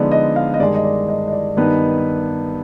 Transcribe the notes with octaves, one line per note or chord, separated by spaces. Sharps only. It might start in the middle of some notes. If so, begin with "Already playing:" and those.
Already playing: D3 F3 G#3 B3 D#4 D5
D#5
F5
D#5
G2 D#3 G#3 D5
D#5
D5
D#5
D#5
D5
G2 D#3 B3 D#4 B4